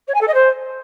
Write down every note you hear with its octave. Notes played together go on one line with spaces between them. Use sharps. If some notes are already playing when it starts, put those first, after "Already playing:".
C#5
G#5
A4
D#5
C5